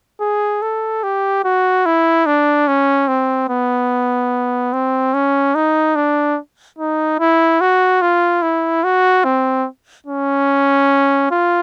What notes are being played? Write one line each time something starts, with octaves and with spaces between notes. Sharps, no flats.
G#4
A4
G4
F#4
E4
D4
C#4
C4
B3
C4
C#4
D#4
D4
D#4
E4
F#4
F4
E4
F#4
C4
C#4
F4